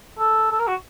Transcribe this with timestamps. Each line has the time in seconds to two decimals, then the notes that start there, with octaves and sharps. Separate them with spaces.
0.19 A4
0.52 A4
0.59 A#4
0.68 F#4